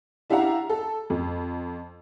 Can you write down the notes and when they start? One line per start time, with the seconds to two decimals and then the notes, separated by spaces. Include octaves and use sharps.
0.30 D4 E4 G4 F5 F#5 A#5
0.69 A4
1.10 F2